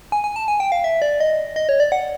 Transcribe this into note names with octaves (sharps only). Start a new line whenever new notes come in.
G#5
G#5
A5
G#5
G5
F5
E5
D5
D#5
D#5
C#5
D5
F#5